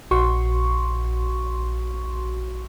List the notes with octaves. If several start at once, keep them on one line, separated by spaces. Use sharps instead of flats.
A#1 F#4 C6 C#6